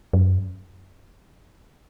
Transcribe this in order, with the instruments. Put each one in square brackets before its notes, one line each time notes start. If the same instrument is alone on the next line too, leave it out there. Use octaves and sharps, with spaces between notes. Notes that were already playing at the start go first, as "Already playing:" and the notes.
[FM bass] F#2